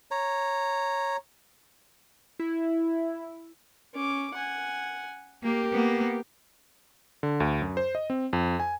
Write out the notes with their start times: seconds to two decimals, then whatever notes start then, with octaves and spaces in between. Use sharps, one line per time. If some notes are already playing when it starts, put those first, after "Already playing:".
0.11 C#5 A#5
2.40 E4
3.94 C#4 D6
4.34 F#5 G#5
5.43 A#3 G4 A#4
5.72 A#3 B3
7.23 D3
7.40 D2
7.62 F#2
7.77 C5
7.95 D#5
8.10 C4
8.33 F2
8.60 G#5